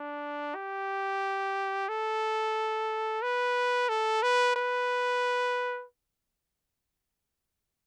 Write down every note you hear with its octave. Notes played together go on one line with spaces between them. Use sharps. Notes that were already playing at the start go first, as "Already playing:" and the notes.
Already playing: D4
G4
A4
B4
A4
B4
B4